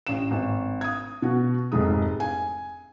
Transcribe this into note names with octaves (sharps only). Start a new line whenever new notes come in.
A1 E7
G#1
D#6 G#6
B2 F#4
F1 F2 G#2 G#3 D#6
G#5